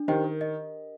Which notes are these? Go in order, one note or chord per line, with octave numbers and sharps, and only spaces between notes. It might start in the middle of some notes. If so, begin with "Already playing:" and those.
Already playing: D4
D#3 G4 C5 D#5 G5
A#4
D#5